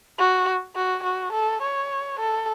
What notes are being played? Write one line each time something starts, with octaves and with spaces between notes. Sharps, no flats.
F#4
F#4
F#4
A4
C#5
A4